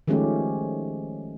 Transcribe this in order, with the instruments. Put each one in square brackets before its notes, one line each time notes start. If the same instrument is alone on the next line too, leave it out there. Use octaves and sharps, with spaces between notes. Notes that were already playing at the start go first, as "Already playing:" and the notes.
[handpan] D#3 F3 G#3 A3 C#4 G4